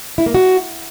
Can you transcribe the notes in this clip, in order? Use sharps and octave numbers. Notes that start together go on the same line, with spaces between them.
E4
A#3
F#4